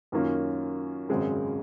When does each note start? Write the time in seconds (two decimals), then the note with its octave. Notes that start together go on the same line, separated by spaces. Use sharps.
0.12 F#2 D#3 A#3 C#4 F4
1.09 G#1 F#2 C#3 G#3 C4